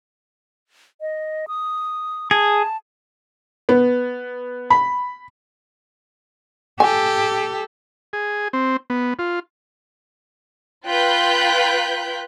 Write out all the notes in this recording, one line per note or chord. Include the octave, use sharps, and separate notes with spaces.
D#5
D#6
G#4 A5
B3
B5
G4 A4 G#5
G#4
C4
B3
F4
F4 B4 G5 F#6 G6 B6